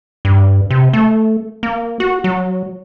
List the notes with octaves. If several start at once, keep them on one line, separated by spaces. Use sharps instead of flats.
G2
C3
A3
A#3
F#4
F#3